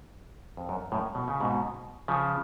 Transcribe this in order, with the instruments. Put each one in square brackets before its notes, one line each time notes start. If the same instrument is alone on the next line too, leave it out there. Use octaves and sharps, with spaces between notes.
[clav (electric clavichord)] F2
F#2
F#2 A2
B2
C#3
G#2 B2
C#3 F3